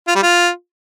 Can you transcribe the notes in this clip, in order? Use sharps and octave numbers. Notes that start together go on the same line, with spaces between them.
F4
G3
F4